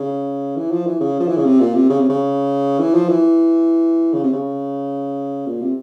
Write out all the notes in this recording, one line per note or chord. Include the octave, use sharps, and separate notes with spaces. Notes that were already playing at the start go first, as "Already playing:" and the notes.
Already playing: C#3
E3
F3
E3
C#3
F3
E3
C#3
C3
A#2
C3
C#3
C3
C#3
E3
F3
E3
C#3
C3
C#3
A#2
C3